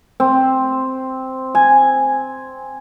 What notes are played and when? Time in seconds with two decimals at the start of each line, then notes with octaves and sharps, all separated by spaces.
0.20 C4
1.55 G#5